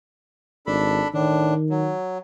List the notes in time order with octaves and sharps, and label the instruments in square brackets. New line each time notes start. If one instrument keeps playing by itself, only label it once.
[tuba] G#1 [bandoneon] D4 A4 B5
[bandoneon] A2 D4 [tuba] D#3
[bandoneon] F#3